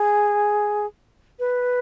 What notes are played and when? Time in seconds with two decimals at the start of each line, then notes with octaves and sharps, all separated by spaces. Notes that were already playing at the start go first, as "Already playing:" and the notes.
Already playing: G#4
1.39 B4